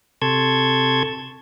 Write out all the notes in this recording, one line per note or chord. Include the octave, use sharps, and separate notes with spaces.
C3 A4 A5 C6 C#6 G#6